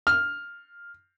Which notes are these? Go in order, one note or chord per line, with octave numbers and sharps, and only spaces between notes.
F6